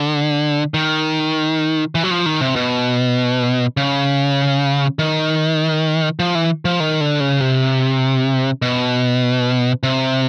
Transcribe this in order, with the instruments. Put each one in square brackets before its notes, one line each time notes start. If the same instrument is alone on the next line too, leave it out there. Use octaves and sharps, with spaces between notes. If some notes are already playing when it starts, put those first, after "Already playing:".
Already playing: [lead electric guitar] D3
D#3
E3
F#3
F3
D#3
C3
B2
C#3
D#3
F3
E3
F3
D#3
D3
C#3
C3
B2
C3